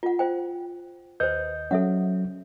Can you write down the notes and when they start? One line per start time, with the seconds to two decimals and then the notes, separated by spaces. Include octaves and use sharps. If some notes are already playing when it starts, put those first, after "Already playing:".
0.03 F4 F#5
0.19 F4 C5 G5
1.20 D#2 B4 C5 D#5 G6
1.71 F#3 C#4 A4 E5 F#5